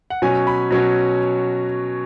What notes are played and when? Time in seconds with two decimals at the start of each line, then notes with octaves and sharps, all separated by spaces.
0.10 F#5
0.22 B2 F#3 C#4 G#5
0.47 B5
0.71 B2 F#3 C#4